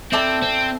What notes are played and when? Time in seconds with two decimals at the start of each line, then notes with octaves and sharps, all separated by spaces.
0.12 C4 E4 A4 D5 A5
0.42 C4